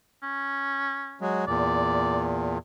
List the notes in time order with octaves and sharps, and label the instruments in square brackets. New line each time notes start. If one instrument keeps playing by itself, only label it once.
[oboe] C#4
[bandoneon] F#3 G#3
[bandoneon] E2 A#2 [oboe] D5